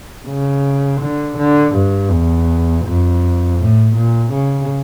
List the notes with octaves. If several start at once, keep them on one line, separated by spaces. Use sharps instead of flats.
C#3
D3
D3
G2
E2
F2
A2
A#2
C#3